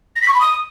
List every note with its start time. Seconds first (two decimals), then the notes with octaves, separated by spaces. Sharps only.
0.16 A#6
0.22 B6
0.28 C#6
0.34 B5
0.40 D#6